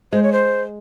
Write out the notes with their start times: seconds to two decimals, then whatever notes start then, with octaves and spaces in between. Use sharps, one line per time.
0.12 G#3 C5
0.23 C#5
0.32 C5